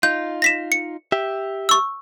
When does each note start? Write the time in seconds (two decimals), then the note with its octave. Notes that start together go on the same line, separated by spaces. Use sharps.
0.03 D#4 F4 G6
0.42 A#6 B6 E7
0.72 C#7
1.12 G4 E5
1.69 C#6 E6